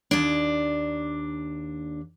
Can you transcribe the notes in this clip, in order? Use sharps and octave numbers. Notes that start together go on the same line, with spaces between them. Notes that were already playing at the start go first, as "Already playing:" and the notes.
D#2 D4